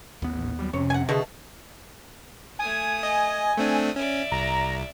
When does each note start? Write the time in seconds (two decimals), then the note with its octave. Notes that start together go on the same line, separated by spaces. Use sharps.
0.22 A1 D#2 B3
0.59 F#3 G3
0.73 F2 C3 C#4 C#5
0.90 F#5 G#5
1.09 B2 D3 A3 F#4 G#4
2.59 A3 G#5 D#6
3.03 D#5
3.57 A3 C4 D4 D#6
3.96 C#4 D5 E5
4.32 C2 A#5